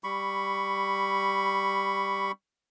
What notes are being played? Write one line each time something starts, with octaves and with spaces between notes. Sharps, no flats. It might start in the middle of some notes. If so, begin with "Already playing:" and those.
G3 B5 C#6